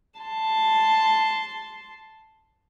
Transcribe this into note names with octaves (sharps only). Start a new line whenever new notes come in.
A5 C6